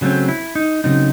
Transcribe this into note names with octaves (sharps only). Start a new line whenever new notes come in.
C#3 F#3 A3 C4
E4
D#4
C#3 F#3 A3 C4 D#4